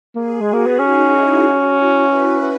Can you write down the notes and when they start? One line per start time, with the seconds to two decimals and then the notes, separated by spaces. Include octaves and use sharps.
0.15 A#3 G#4
0.40 G#3
0.47 F#4
0.53 A#3
0.66 B3
0.79 C#4 D#4
1.10 E4
1.41 F#4
1.74 E4
2.05 B4